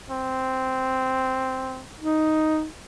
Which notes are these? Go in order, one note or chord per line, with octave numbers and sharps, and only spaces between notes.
C4
D#4